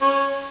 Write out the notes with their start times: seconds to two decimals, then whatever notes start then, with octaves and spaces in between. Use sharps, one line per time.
0.01 C#4